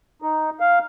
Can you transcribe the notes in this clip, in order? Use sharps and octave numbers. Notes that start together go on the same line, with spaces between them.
D#4
F5